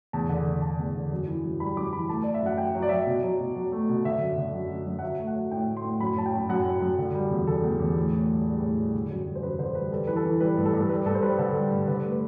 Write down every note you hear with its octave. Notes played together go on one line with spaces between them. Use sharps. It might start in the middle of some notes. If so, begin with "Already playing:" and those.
E2 A5
D3
D3
D3 A5
E2
D3
F#2
E3
F#2
G3 B5
F#2 D6
E3 B5
A3 A5
A3 D5
E5
F#2 F#5
F#2 G5
F#3
D5
F#3 E5
D5
B2
F#3
B2
F#3
A3
B2
D3 E5
F#2
D3
F#2
F#2
F#2
F#5
F#3 E5
A3
F#5
F#3
A2 G5
A3
C6
A2
F#2 B5
F#3 A5
G5
F#2
F#2 F#5
F#2
F#2
D3
G3
E2
D3 A4
E2
E2
A2
A2
G3
G3
A2
G3
D3
F#2
G3
C5
F#2 B4
D3 C5
G3 B4
G3 A4
E3 B4
A4
E3
G3 B4
G2
A4
G2
A4
G3 B4
G2 A4
C5
G3 B4
D3 A4
G3
G2
D3 B4
A3
B4